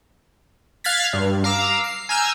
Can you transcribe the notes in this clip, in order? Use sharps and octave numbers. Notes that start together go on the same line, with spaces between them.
F5 F6 F#6 G#6 A6 B6
G2
F5 A#5 D6 E6
C7
G#5 A#5 E6 F6 G6